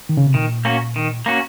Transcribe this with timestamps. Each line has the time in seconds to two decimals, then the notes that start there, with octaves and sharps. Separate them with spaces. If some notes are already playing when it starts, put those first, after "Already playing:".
0.09 D#3
0.17 C#3
0.26 C3
0.34 A#2 D#3
0.65 A#3 C#4 F#4
0.96 D#3
1.26 A#3 C#4 F#4